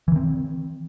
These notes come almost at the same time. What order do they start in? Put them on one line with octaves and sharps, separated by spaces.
E3 D#3 C4